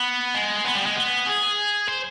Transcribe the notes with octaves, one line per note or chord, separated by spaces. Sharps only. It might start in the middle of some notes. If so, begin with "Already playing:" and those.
Already playing: B3
G#3
B3
G3
G#3
B3
G#4
C5